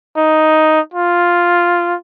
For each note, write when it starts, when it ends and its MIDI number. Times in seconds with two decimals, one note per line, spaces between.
0.17 0.80 63
0.94 1.95 65